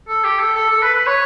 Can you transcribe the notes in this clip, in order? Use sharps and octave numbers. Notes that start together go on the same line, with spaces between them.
A4
G4
A4
A4
A4
B4
B4
C#5